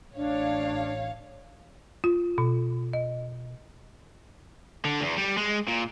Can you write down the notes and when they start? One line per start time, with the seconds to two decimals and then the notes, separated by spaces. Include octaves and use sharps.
0.16 A1 D4 C#5 F5
2.04 F4
2.38 B2
2.93 D#5
4.85 D3
5.01 E2
5.17 G3
5.37 G#3
5.68 A#2